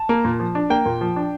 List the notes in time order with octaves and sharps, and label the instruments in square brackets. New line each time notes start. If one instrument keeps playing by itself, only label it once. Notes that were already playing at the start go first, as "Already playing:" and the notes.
Already playing: [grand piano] A5
A#3
A#2
F3
D4
A#3 G5
A#2
F3
D4